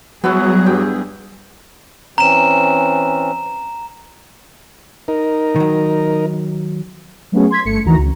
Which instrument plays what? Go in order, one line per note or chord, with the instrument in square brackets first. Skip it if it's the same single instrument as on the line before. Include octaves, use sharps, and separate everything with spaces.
[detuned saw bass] F#3 [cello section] G3 G#4 [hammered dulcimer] B3 E4 F#4
[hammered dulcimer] G2 G5
[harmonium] E3 C4 C#4 [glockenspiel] A#5 E7
[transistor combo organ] D#4 A#4
[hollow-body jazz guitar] D#3 F#3
[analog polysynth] F#3 A3 B3 C#4 F#4 G#4
C6 G#6 B6
G1 A3 C#7
D2 D#3 E3 F#4 A#5
C#2